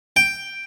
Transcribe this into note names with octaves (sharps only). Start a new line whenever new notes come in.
G5